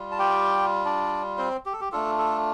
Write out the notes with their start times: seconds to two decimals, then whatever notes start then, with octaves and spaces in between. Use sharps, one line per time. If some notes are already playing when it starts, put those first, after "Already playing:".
Already playing: G3 F4
0.11 A5
0.19 G4 G5
0.85 D4 D5
1.38 C4 C5
1.66 G4
1.73 A4
1.81 G4
1.92 A3 D4 F4 A4
2.18 A4